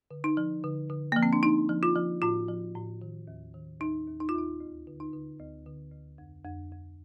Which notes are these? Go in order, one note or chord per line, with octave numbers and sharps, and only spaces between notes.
D3
D#4
F3
D3
D3
F3 A#3
C4
D4
F3 D#4
F3
F4
F3
A2 F4
F3
A2
D#3
D#2
D#3
D#2 D#4
D#2
D#4
F4
D#2 D#4
D2
D3
D#4
D3
D2
D3
D2
F2
F2
F2